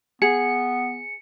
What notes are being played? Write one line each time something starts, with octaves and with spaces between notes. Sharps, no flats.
B3 G#4 C#7